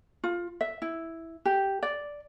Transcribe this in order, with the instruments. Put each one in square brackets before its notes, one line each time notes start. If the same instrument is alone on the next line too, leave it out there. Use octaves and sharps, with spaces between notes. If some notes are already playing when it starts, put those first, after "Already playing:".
[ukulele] F4
E5
E4
G4
D5